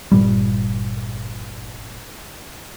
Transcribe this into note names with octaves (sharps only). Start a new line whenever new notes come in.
G1 A#2 G3